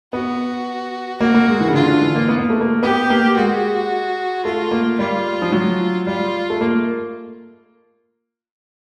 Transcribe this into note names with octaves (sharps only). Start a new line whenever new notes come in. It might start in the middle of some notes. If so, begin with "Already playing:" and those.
B3 F#4
A#3 F#4
A#3
G#3
E3
C#3
D3 F4
D3
E3
A#3
B3
A#3
A3
A#3
B3 G4
A#3
G#3 F#4
A3 F4
A#3
G3 F4
F3
F#3
G3 F4
A3
A#3